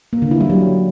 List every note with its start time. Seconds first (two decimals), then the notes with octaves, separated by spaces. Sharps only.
0.13 A#3
0.22 D3
0.31 E4
0.40 G3
0.50 F#3